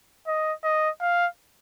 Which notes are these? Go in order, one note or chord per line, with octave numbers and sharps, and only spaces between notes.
D#5
D#5
F5